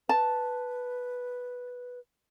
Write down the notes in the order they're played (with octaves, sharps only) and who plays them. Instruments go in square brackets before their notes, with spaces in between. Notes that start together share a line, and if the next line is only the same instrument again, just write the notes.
[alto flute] B4 [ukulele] A5